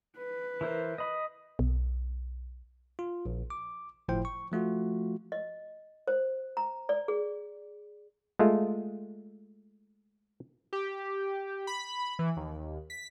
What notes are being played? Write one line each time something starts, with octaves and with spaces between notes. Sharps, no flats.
B4
E3 A#4 C5
D#5 B5
B1
F4
A#1
D6
G1 A2 F3 E4 C5 G5
C#6
F3 A3 F4 F#4
D#5
C5
A#5
D5
G#4
G#3 A3 F4
G4
B5
E3
D#2
B6